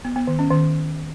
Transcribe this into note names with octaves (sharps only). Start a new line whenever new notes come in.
B3
B3
D#3
C#4
D#3